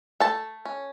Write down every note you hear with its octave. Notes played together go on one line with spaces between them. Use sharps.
A3 A4 A5
C#4